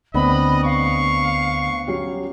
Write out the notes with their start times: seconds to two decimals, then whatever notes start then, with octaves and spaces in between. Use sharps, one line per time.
0.14 D2 B3 C4 D4 D#5 B5
0.64 F5 C#6
1.87 F#3 C#4 G4